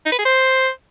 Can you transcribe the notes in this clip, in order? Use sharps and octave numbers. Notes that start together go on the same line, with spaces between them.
D#4
B4
G#4
C5